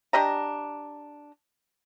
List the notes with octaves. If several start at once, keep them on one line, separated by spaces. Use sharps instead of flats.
D4 G4 D#5 A#5